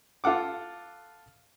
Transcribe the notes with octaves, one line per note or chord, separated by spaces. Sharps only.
F4 A4 F#5 D6